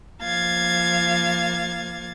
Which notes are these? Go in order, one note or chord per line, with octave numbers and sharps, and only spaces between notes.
F3 A#3 F5 G#6 A6